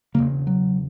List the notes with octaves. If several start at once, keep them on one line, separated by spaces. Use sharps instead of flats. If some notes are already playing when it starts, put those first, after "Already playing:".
E1 D#2 C#3 A#3
F#3